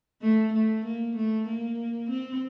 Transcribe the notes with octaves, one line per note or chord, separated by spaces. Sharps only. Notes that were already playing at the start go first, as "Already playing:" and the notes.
A3
A3
A#3
A3
A#3
C4